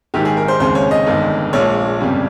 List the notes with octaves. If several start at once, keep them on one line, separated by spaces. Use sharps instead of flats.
A#1 G#2 D#3 G#3 G4
G#4
A#4
C5
F1 D#2 C#3 G#3 C5
C#5
D#5
G1 G2 D#3 G#3
A#1 A#2 F3 G#3 C#5
G1 F2 C#3 G3